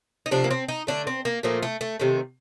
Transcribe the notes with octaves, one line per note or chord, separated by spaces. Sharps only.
D#4
C3 F3 A3 D4
A#3
C4
D#4
D3 F3 A3 D4
C4
A#3
A#2 F3 A3 A#3
A3
A3
C3 D#3 A3